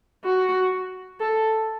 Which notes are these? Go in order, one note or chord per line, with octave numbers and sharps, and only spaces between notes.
F#4
A4